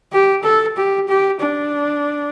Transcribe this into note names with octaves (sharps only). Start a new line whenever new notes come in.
G4
A4
G4
G4
D4